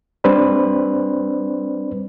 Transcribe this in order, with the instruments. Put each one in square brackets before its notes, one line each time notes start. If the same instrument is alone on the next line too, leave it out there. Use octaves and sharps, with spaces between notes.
[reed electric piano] G3 C4 D4 B4 C5 D5